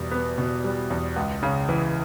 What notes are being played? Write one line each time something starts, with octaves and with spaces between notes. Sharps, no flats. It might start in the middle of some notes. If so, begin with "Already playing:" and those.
Already playing: E2 B2 G3
B3
B2
G3
E2
C#2
C#3
E3